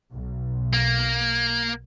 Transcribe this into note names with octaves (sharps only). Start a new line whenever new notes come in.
B1
A#3